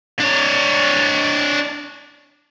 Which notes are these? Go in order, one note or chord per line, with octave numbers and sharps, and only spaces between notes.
D4 C#5